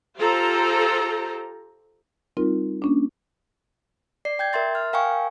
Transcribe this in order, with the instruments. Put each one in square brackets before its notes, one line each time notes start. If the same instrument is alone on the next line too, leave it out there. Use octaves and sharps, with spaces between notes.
[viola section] F4 G4 A4 C5 A#5
[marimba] G3 C4 D#4 F4 A#4
A#3 C#4 D4
[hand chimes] D5 C7
G5 G6 G#6
A#4 E5 C6 A6
F6
A#4 F5 G5 G#5 C#6